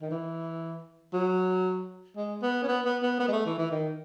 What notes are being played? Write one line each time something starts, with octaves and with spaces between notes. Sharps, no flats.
D#3
E3
F#3
G#3
B3
C#4
B3
B3
B3
B3
G#3
A3
E3
E3
D#3